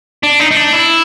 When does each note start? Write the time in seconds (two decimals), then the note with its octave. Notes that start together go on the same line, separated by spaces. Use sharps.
0.23 D4
0.40 D#4
0.51 D#4
0.56 D4
0.73 E4